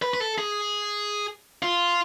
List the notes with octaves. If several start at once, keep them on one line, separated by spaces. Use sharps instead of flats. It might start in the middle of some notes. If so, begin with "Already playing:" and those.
B4
B4
A4
G#4
F4